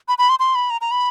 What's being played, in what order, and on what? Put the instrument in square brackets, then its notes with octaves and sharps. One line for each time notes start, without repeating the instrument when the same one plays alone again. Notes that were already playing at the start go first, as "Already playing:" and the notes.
[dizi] B5
B5
C6
C6
B5
A#5
A#5
B5